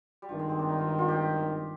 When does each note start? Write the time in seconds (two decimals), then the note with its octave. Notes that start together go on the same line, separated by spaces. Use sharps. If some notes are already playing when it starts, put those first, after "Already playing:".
0.22 G3
0.29 G#1 G2 D#3 F3
0.39 G#3
0.49 C4
0.59 D4
0.69 D#4
0.79 F4
0.89 D#4
0.98 F4
1.08 G4